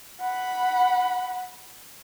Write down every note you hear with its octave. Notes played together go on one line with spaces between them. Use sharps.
F#5 B5